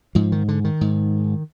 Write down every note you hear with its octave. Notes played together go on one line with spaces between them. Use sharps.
G#2 F3
D#3
D3
D#3
G#2